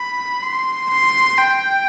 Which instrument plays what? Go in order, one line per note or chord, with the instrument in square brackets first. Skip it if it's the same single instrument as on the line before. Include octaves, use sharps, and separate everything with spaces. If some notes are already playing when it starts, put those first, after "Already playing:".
Already playing: [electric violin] B5
C6
C6
G5